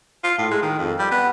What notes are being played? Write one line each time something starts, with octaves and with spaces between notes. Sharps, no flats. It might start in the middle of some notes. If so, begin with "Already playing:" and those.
F4
A2
G#3
D#3
F2
G3
B3